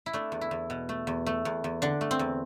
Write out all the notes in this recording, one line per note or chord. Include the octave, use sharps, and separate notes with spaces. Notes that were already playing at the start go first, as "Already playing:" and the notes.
E4
A3 D4
E2
E4
E2
B2
A3
E2
A3
E2
E2
D3 D4
A3
C4
E2